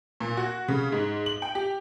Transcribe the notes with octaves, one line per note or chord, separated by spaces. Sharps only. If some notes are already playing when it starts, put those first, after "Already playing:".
A#2
F#4
C#3
G#2
F#7
G5
G4